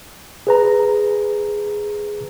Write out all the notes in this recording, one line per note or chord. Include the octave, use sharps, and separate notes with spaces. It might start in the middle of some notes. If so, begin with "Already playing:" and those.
G#4 B4 A#5